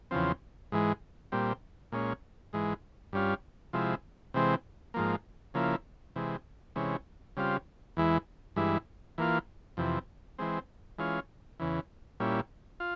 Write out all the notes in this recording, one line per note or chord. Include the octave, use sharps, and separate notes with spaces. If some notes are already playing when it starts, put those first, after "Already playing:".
E2 C#3 F3 C4
G#2 E3 G#3
A#2 G3 C4
A#2 G#3 C#4
G#2 E3 G#3
G2 G3 C#4 F4
C3 F3 G#3 E4
C3 E3 G#3 C4
G#2 F3 A#3
C#3 F3 A#3 E4
C3 E3 G#3
C3 E3 G#3 C#4
C#3 G3 C4 F4
E2 E3 G#3 E4
G2 E3 G#3 E4
E3 A#3 F4
F2 C3 E3
E3 G#3 C4
E3 G#3 C#4 F4
E2 C#3 E3
A#2 G3 C#4 E4
F4